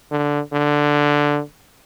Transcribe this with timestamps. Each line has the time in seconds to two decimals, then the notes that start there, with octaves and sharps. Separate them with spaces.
0.11 D3
0.53 D3